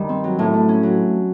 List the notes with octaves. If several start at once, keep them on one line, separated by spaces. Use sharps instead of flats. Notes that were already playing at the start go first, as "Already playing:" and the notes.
Already playing: G2 D#3 G3
C4
F#3
A2
A3
C#4
F#3